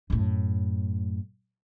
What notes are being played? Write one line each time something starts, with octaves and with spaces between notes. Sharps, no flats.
F#2 A2